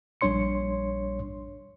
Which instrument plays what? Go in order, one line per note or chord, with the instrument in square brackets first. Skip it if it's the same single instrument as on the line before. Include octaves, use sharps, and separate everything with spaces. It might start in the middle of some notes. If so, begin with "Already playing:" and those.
[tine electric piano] A#1 G3 D4 C#5 C6 C#7